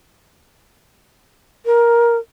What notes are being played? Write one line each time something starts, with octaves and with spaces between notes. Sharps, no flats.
A#4